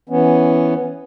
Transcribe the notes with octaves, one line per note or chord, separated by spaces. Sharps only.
E3 B3 C#4